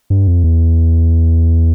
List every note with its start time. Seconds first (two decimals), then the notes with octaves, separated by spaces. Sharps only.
0.10 G2
0.27 F2
0.44 E2